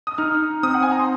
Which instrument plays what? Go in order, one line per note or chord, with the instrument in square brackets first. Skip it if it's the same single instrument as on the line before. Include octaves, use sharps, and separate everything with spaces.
[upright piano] D#6
[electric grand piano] D#4 [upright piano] F6
[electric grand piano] C4 [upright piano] D#6
[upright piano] F#5
G#5
A#5
C6